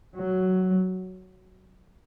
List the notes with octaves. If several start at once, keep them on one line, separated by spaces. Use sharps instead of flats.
F#3